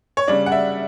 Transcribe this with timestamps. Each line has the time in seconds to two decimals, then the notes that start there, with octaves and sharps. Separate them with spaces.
0.17 C#5
0.28 C#3 G3 D4 D5
0.46 F#5
0.52 E5